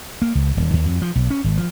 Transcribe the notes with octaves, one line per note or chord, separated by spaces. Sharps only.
A#3
C#2
D#1
D#2
F2
F3
B1
C#4
G#1
F3